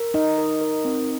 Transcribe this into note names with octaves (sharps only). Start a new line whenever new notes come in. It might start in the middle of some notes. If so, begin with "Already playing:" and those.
Already playing: A#4
D#4 D#5
A#4
A#4
C4